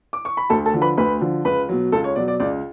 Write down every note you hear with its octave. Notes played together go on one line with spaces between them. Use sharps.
D6
C#6
B5
D2 A4 A5
A4 A5
D3 F3
B4 B5
D2 B4 B5
D3 F3
C#2 B4 B5
B2 F#3
C#2 A4 A5
C#5
B2 F#3 D5
D5
C#2 D5